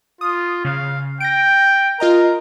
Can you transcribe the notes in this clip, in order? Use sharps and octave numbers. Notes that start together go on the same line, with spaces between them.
F4 D#6
C#3 F5
G5 A#6 D7
F4 A#4 D#5 A#5